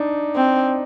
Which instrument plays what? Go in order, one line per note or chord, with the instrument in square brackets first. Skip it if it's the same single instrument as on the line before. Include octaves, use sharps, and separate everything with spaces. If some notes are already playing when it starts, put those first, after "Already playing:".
Already playing: [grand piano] D4 D#4
[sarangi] C4